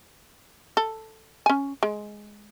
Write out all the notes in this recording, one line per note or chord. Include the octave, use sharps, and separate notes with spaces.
A4
C#4 G#5
G#3